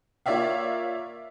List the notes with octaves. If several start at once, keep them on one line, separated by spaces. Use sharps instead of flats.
A#3 F4 C#5 D5 E5 F5